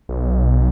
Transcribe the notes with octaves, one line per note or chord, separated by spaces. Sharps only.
B1